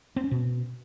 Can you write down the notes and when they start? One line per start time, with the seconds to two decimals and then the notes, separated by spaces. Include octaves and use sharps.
0.16 C4
0.24 C#4
0.31 B2